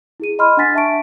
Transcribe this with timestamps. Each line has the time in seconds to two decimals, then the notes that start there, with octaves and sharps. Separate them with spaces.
0.20 E4 G#4 D#7
0.39 D#5 B5 C6 F6
0.57 D4 F#5 G#5 A6 B6
0.75 E5 A5 C#6 D7